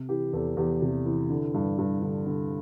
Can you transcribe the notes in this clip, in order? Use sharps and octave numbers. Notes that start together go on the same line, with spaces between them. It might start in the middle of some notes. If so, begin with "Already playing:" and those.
Already playing: C3
E3 G4
E2 A4
E2 G4
C3
E3
D3
G2
G2
D3
D3